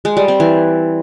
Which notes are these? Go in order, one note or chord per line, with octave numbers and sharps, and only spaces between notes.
G#3
G3
C4
E3